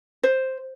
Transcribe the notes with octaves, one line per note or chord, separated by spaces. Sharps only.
C5